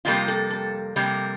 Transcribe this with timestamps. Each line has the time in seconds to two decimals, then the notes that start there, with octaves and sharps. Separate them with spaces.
0.05 F2 C3 G3 A#3 F4
0.28 A4
0.50 A4
0.96 F2 C3 G3 A#3